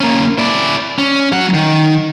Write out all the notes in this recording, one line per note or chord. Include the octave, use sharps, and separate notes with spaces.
A#3 C#4
E4 D5
C#4
F#3 F#5
D#3